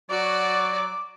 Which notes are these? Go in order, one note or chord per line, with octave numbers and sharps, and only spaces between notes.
F#3 F#4 D5 D6